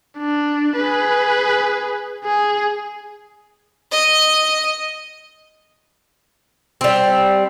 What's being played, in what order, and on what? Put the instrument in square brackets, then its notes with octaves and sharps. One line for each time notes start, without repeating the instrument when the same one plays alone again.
[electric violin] D4
G#4 B4
G#4
[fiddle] D#5
[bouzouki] G3 C4